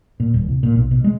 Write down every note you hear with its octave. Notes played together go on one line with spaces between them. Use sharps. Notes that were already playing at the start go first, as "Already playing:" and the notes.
A#2
D#1
C2
A#2
B1
B2
G#3